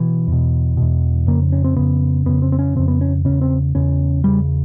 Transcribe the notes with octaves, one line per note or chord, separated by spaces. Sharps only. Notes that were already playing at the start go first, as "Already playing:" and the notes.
Already playing: B2 E3
E2 B2
E2 B2
F2 C#3 A#3
C#4
C4
F2 C#3 B3
F2 C#3 B3
C4
C4
C#4
F2 C#3 C4
B3
C#4
E2 C#3 C#4
C4
E2 C#3 C#4
E2 C#3 G3